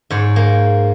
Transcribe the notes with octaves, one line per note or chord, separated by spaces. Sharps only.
G#2 C#5
A#3